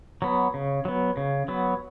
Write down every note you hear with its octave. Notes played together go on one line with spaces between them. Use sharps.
F#3 B3
C#3
F#3 B3
C#3
F#3 B3